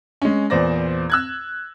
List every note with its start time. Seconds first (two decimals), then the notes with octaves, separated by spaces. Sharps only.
0.22 G#3 C#4
0.50 E2 A#2 C5 D5 A#6
1.10 E6 F#6 G#6